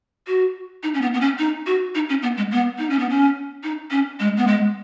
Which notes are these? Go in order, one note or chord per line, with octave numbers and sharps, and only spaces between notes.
F#4
D#4
C#4
B3
B3
C#4
D#4
F#4
D#4
C#4
B3
G#3
B3
D#4
C#4
B3
C#4
D#4
C#4
G#3
B3
G#3